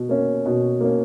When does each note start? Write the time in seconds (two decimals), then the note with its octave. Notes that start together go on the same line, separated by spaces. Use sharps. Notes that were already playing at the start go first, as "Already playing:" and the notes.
Already playing: B2
0.09 A#3 C#4
0.45 B2
0.80 A#3 C#4